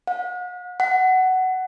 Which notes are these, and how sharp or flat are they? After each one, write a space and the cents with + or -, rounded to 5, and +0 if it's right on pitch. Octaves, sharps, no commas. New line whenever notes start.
F#5 -45
F#5 +15